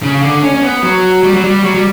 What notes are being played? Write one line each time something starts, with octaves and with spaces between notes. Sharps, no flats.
C#3
D3
C#4
C#4
B3
F#3
G3
F#3
G3
F#3
G3